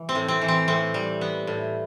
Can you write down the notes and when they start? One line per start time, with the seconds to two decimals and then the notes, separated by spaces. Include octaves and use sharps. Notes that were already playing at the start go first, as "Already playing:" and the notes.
Already playing: E3
0.09 C4
0.15 A2
0.28 C4
0.41 E3
0.48 C4
0.68 A2 C4
0.94 G3
1.21 B3
1.47 A2